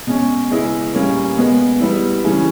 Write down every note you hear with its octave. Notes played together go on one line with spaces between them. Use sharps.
B2 G#3 C#4
C#3 G#3 B3 E4
A#2 G3 A#3 C#4
B2 G#3 B3
G3 B3 E4
C#3 E3 G3 C#4